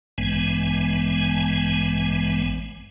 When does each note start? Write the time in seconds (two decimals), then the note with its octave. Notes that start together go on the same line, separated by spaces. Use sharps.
0.18 A1 G2 E3 G#3 B3 G#5